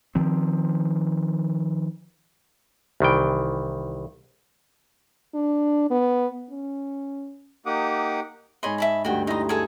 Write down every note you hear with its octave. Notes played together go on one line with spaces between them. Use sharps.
D#3 F3 C4
C2 D#3 E3 G5
D4
B3
C#4
A#3 D#4 G4 F#5 D6 D#6
G#2 C#5 D#5 B5 C6
E5 A5 B5
D2 G2 F#4 G5
D#4 E4 D#5 A#5 C6
G#4 A4 G#5